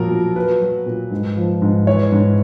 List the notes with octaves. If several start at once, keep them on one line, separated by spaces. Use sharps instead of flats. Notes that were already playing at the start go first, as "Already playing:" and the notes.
Already playing: A#2 F3 F#3 A#4
A#2
F#3 B4
F#3
A#2
G#2
F3
G#2
E3 C#5
G#2